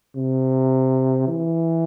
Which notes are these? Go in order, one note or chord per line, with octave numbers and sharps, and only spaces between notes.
C3
E3